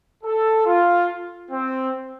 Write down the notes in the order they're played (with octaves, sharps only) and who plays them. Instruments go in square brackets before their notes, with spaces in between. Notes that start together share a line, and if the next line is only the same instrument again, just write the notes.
[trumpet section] A4
F4
C4